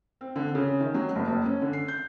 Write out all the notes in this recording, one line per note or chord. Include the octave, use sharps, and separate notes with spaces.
C4
D3
C#3
D#3
F#3
F#1
F#1
C#4
D3
C7
G6